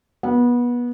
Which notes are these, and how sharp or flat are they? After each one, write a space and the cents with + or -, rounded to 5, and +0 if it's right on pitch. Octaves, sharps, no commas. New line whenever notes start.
B3 -25